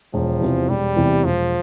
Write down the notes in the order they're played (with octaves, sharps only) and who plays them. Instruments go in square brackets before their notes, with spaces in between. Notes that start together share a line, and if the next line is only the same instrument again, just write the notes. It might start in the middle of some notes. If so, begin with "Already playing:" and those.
[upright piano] E1 [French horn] F3
[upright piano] E2 C3 E3
[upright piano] E1 [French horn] G3
[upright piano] E2 C3 E3
[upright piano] E1 [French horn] F3